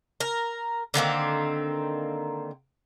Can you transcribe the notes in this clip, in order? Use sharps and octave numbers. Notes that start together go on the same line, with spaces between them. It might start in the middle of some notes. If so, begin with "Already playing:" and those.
A#4
D3 D#3 A#3 C4